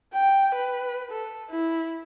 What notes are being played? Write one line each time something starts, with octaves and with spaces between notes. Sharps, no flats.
G5
B4
A4
E4